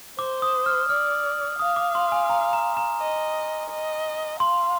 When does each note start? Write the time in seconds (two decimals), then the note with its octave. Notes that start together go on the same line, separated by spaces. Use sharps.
0.19 C5 D6
0.42 D#6
0.66 F6
0.89 D5 F6
1.59 F5 D#6
1.76 D6
1.95 C6
2.12 G#5
2.30 A#5
2.53 A#5
2.77 A#5
3.00 D#5
3.70 D#5
4.40 F5 C6